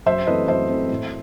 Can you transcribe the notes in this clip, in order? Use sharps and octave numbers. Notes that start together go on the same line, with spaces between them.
F#2 C5 E5
E3 A3 C4 B4 D#5
F#2 C5 E5
E3 A3 C4
A2